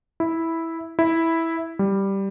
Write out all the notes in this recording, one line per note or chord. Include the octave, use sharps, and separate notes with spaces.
E4
E4
G3